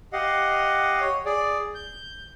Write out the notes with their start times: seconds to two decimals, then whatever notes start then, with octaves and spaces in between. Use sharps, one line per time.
0.13 G4 D#5 F5 F#5
1.01 C#5
1.26 G#4 D5
1.75 G6